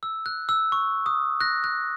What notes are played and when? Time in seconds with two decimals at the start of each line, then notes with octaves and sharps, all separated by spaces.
0.03 E6
0.26 F#6
0.49 E6
0.72 C#6
1.06 D#6
1.41 F#6 A#6
1.64 F#6